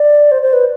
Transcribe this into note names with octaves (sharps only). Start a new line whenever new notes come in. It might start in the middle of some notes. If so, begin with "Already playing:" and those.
Already playing: D5
C5
C5
B4